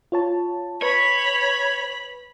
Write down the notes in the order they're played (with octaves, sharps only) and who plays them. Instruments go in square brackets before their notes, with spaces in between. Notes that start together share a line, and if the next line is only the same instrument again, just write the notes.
[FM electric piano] F4 C#5 A5
[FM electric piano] B4 [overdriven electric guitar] C#5 [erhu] B5